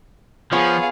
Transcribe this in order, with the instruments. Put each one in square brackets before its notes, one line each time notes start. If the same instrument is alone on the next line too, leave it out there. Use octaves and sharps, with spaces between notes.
[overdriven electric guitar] F3 [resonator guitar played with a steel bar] B3 F4 C#5 [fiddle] G#4 F5